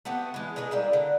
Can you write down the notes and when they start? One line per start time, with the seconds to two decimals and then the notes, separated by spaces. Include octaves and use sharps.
0.05 A3 B3 F#4 G4
0.34 E3 G#3
0.56 G#3 B3 D#4 G#4
0.71 G3 A#3 E4
0.93 D3